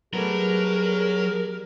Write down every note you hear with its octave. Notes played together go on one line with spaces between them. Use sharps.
F#3 G3 A3 B3 G#4 A#4